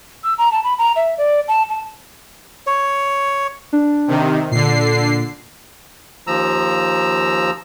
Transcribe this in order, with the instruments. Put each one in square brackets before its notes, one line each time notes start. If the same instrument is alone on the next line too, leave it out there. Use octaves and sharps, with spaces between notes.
[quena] E6
A#5
A5
B5
A#5
E5
D5
A5
A5
[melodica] C#5
[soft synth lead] D4
[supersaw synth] C3 D#3
[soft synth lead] A#2 [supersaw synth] D3 C7
[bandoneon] D#2 F3 A#5 E6